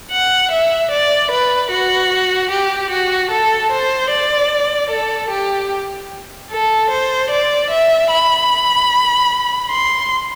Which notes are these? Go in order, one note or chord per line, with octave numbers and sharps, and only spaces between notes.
F#5
E5
D5
B4
F#4
G4
F#4
A4
C5
D5
A4
G4
A4
C5
D5
E5
B5
C6